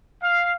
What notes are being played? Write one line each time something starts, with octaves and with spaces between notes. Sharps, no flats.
F5